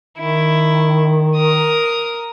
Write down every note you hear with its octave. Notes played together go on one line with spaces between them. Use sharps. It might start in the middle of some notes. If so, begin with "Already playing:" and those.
D#3 E4
A#4 D#6